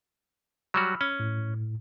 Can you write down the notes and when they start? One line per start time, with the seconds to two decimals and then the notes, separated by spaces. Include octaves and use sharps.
0.74 F#3 G3 F#4 B5 E6 F6
1.01 C#4
1.20 A2